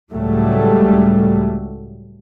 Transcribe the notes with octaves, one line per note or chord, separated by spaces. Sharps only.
C#2 A2 F#3 G3 A3